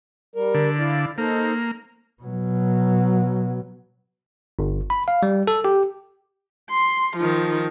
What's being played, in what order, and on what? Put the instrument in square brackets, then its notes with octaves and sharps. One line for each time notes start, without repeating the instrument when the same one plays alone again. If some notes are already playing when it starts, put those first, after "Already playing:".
[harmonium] G3 A#4
[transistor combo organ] D3
[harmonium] E4 D5 F5
[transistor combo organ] A#3 [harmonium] D#4 A4 C5
[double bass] B2 F#3
[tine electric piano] G1
B5
F5
G3
A4
G4
[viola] C6
D#3 F3